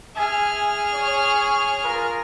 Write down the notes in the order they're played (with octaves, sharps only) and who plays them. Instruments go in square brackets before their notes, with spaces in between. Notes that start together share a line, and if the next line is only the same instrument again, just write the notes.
[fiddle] G#4 F6 [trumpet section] E5 G#5
[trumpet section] C#5
F4 A#4